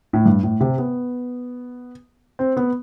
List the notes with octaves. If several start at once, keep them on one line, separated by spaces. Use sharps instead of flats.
A2
G2
A2
C3
B3
C4
B3